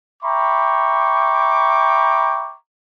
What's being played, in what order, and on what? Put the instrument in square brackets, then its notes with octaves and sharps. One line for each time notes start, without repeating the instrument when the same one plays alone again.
[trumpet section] E5 G5 A#5 B5 C#6 D6